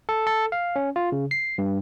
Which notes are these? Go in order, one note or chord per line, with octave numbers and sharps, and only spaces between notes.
A4
A4
F5
C#4
F4
C#3
C7
G2